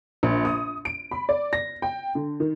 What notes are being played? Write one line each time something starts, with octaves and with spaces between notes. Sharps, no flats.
A#1
D#6
D7
B5
D5
A#6
G5
D3
D#3